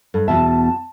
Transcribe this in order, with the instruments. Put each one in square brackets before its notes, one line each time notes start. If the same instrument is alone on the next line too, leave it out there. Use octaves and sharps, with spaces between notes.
[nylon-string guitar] G2 [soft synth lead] A4
[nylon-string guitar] E2 B2 E5 [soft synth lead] A5